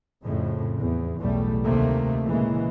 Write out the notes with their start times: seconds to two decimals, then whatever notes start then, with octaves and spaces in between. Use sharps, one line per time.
0.23 F2 A2 C#3
0.78 E2
1.19 B1 E2 A2 G3 A3
1.64 D2 C3 D#3 A3 A#3
2.26 A#2 C#3 E3 G#3 A#3